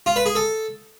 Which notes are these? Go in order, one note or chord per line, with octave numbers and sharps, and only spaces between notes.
F4
B4
G#4
A4